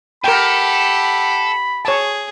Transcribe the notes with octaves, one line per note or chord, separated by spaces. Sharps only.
G4 A4 A#4 F#5 G5 B5
G#4 C#5 A5